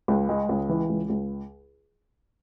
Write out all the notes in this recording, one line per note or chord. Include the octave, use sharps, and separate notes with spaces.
C#2
G#3
C#2
E3
C#2
C#2